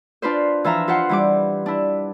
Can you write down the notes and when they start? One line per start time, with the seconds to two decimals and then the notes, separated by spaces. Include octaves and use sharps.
0.22 D4 F4 B4 C5
0.64 E3 F3 E5 A#5
0.88 F4 B4 C5 F#5
1.09 E3 G3 D6
1.66 D4 E4